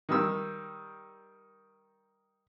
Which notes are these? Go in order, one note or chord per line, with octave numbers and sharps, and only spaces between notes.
D#3 G3 E6